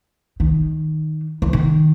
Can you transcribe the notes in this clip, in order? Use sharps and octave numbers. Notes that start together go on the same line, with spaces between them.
D#3
E3
D#3